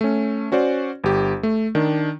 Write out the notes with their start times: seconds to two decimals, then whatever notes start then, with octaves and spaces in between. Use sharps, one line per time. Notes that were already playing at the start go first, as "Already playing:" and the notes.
0.01 A3 C#4
0.52 C#4 F#4 C5 D5
1.04 G1 G4
1.43 A3
1.75 D#3 D4